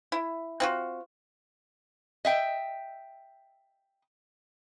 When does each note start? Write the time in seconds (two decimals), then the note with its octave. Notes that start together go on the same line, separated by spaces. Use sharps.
0.12 E4
0.60 C4 F4 F#4
2.25 D#5 E5 G5